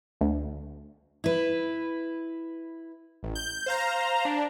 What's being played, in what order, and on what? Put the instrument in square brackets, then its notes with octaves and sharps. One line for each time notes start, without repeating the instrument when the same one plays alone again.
[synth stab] D2
[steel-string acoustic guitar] E4 B4
[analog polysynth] A1
G6
C5 F5 A#5
D4